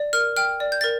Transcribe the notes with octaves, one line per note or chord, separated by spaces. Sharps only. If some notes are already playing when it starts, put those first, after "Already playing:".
Already playing: D5
A#4 F6
G5 F6
D5
G6
A#4 A6